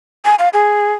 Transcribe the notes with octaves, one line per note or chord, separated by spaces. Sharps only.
G#5
F5
G#4